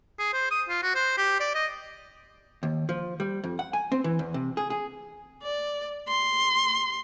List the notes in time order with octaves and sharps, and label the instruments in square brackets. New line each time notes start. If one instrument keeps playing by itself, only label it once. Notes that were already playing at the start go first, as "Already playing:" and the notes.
[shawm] G#4
C5
D#6
F4
F#4
C5
G4
D5
D#5
[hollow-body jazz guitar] D#2
F3
G3
F2
F#5
G#5
C4
E3
E2
C3
G#4
G#4
[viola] D5
C6